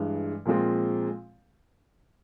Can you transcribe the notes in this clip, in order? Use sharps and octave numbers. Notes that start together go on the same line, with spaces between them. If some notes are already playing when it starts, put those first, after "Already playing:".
Already playing: G2 E3 G#3
A#2 F3 G#3 C4 F4